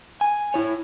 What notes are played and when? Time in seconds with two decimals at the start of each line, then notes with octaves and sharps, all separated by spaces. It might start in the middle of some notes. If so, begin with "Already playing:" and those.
0.21 G#5
0.54 E4 C#5